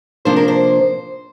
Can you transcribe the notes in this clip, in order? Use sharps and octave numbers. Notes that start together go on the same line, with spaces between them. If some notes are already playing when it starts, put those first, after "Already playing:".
C3 F3 A#3 D4 C5
A#4
C5